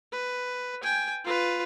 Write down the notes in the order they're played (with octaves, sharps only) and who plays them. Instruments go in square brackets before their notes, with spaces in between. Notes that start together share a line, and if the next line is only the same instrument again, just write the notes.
[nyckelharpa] B4
G5 G#5
F4 B4